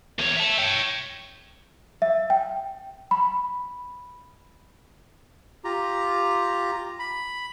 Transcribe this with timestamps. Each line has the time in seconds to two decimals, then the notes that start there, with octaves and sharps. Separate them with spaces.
0.19 E2 C#5
0.37 E5 A5
0.58 C#5 G5
2.02 E5
2.30 G5
3.11 B5
5.64 F4 G4 A#5
6.99 B5